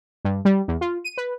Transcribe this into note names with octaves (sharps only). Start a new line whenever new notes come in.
G2
G3
E2
F4
D#7
B4